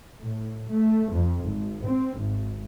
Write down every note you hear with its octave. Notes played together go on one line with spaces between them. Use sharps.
A2
A3
F2
G#1
C4
G#1